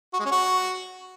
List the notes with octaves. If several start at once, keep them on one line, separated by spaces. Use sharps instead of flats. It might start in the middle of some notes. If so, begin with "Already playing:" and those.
F#4
G#3
C#4
F#4